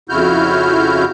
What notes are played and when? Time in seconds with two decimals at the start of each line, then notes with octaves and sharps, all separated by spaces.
0.09 F2 C#3 E4 F#4 F6 G6